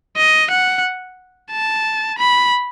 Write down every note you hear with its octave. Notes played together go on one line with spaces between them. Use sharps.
D#5
F#5
A5
B5